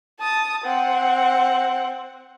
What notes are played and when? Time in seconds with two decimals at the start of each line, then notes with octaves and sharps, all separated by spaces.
0.20 A5 D#6
0.64 C4 F#5